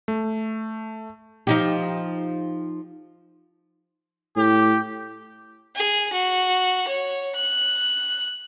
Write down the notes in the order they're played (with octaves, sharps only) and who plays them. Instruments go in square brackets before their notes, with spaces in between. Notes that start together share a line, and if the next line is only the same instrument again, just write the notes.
[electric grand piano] A3
[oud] F3 D#4 G4
[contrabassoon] A2 [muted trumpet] G4
[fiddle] G#4
F#4
C#5
F#6